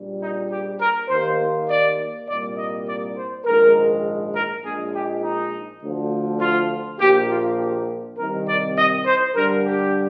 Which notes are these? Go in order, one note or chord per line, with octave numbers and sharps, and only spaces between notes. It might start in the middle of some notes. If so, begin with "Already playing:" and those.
Already playing: A#1 A#2 G3
D#4
G4
A#4
D#2 D#3 A#3 C5
D5
C2 A#2 G3 A#3 D5
D#5
D5
C5
A#1 G#2 D#3 G#3 A#4
A#4
A#1 A#2 G#3 G#4
G4
D#4
D2 D3 F3
F4
A#1 A#2 F3 A#3 G4
F4
G4
C2 C3 D#3 A#4
D5
D#5
C5
G2 D3 G3 A#4
G4